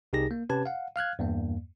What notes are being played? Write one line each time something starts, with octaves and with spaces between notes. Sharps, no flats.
C2 C3 D#4 G4 G#4 A#6
A#3
C3 C#4 G4 B4 A5 G#6
F5 F#5
F5 F6 F#6 G#6
E2 G2 A#3